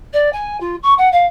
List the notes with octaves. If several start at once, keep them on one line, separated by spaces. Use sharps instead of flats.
D5
G#5
F4
C#6
F#5
F5